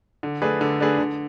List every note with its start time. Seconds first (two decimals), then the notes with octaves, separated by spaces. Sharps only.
0.23 D3
0.42 A3 D4 G#4 B4
0.61 D3
0.80 A3 D4 G#4 B4
0.98 D3